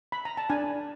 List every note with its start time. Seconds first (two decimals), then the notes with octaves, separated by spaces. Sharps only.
0.12 B5
0.25 A#5
0.37 A5
0.50 D4 G#5